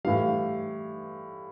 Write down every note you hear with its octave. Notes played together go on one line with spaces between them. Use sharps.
A2 E3 G3 F5